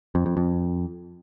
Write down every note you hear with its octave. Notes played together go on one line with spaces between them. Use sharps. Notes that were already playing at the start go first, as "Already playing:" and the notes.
F2
F2
F2